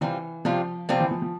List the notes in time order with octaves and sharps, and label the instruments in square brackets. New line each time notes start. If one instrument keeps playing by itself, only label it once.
[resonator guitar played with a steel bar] C3 G3 C4 F4 [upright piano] E3
[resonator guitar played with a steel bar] C3 G3 C4 F4 [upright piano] F3
[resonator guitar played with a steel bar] C3 G3 C4 F4 [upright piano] F3
[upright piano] E3
F3
F3